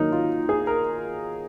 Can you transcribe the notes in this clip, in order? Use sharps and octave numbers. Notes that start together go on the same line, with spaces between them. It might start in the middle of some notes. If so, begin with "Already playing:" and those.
Already playing: D#3 F#3 A#3 D#4 A#4
F4
G#4
A#4